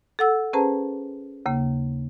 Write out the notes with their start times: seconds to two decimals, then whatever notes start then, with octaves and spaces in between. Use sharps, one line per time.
0.19 A4 F#5 E6
0.53 C#4 G#4 B4 C5 A5 A#5
1.46 D#2 C#3 A#3